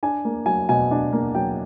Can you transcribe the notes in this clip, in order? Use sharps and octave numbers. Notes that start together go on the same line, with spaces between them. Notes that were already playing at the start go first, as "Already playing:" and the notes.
D4 G#5
A#3
F#3 G#5
B2 G#5
D4
A#3
F#3 G5